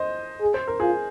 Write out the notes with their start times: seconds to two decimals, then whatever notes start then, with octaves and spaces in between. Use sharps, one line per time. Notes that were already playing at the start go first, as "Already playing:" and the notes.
Already playing: C5 D#5
0.41 G#4
0.54 C5
0.67 A#4
0.80 F4 G#4